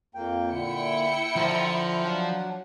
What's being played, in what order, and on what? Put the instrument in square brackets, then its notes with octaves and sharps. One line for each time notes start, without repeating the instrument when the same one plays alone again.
[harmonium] F2 A#3 G5
[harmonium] A#2 D3 [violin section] E4 G5 C#7
[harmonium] D3 A#5 [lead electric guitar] F3 C5
[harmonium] F#3 D4 F#5